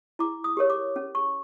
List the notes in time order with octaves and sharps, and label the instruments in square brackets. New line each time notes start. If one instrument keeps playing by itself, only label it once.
[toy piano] E4 D6
D#6
G4 A#4 C#5
D6
C#4
C#6